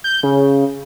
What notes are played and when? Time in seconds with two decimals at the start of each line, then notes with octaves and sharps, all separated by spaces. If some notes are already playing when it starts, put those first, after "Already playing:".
0.04 G6
0.23 C#3